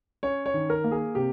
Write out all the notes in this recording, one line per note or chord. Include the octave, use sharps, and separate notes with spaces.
C#4 C#5
C#5
D#3
A#4
A#3
G#4
C3 G4